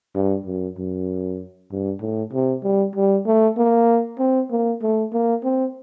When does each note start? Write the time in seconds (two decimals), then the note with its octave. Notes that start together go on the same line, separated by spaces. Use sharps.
0.15 G2
0.46 F#2
0.78 F#2
1.71 G2
2.01 A2
2.33 C3
2.63 G3
2.96 G3
3.26 A3
3.57 A#3
4.19 C4
4.51 A#3
4.82 A3
5.13 A#3
5.43 C4